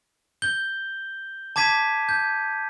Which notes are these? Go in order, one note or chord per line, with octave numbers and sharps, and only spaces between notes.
G6 G7
A5 D6 G#6 B6 D#7
G6